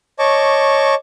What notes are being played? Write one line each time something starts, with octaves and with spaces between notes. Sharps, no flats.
C#5 D#5 A5 C#6 D6